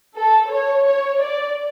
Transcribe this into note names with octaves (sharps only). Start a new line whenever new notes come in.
A4
C#5
C#5
D5